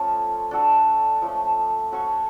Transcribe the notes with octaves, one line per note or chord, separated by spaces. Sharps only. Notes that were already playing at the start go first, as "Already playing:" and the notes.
Already playing: F3 A3 C#4 F4 A4
D4 F#4 A4
F3 A3 C#4
C#4 F#4 A4 C#5